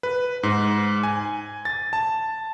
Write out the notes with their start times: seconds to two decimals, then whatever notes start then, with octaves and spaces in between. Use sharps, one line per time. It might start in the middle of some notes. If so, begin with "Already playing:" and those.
0.03 B4
0.43 G#2
1.03 G#5
1.65 A6
1.93 A5